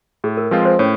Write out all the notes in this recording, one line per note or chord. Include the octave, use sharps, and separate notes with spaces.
A2 G#4
A#4
F3 G#3 C4 F4 B4
C5
A2 C#4 C#5